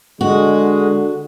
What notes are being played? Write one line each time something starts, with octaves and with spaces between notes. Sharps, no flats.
D3 G#3 F#4